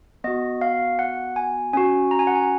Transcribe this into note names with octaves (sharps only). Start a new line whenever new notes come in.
B3 F#4 D#5
F5
F#5
G#5
C#4 F#4 G#5
A#5
G#5
F#5
G#5